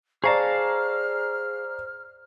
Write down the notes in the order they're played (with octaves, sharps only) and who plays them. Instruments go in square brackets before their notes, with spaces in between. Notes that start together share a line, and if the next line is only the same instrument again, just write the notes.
[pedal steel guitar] G#4 F5 A5 [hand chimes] C5 [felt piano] D5 A#5 C#6 [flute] F6